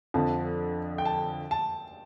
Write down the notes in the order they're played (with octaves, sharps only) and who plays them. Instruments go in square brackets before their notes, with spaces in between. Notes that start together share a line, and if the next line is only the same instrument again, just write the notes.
[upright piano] F2 D3 F3 [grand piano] A5
[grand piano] G5
A5
A5